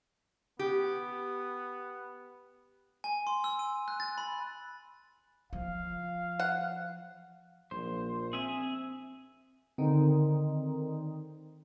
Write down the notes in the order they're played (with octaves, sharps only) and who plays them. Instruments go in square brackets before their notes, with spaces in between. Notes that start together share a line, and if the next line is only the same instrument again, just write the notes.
[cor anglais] B3 [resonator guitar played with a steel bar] G4
[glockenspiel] G#5
C6
E6
D#7
F#6
A6
B5
[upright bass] F3 [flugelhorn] F5
[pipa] F#5
[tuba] A#1 [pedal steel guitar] C5
[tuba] C4 [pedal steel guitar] G#4 E5 G#5
[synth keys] D3 D#3 C4 D#4